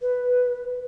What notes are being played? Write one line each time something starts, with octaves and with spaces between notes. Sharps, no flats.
B4